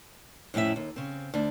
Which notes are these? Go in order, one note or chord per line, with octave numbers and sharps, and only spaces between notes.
F2 A2 C#4 E4 E5
D#2
C#3 C4
D2 D4